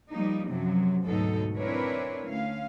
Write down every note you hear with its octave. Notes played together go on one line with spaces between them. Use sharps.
F3 G3 A#3 D#4
F#2 C3 F3 F#3
D2 G#2 B2 F#3 D#4 A4
C4 D4 E4 A#4 B4 C#5
D2 C#4 F5